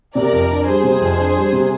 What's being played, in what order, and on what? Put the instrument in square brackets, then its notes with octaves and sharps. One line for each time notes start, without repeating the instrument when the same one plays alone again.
[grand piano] C3 [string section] A#4 D5
[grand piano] F2
D4
[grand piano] G3 [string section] G#4 C5
[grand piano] C3
F2
D4
G3
C3